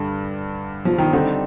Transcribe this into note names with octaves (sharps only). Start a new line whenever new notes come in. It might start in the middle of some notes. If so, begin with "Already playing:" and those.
Already playing: G2 D3 G3
F3
D#3
D3 G3 C4 D#4